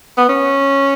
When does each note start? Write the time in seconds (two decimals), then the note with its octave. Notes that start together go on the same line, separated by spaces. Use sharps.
0.17 B3
0.29 C#4